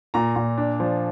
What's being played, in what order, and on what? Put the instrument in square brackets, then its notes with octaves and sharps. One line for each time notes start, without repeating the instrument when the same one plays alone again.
[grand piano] A#2 A#5
A#2
D4
F3